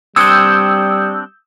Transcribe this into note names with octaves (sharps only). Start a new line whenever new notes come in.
G3 C4 D4 D#6 E6 G6 G#6 C#7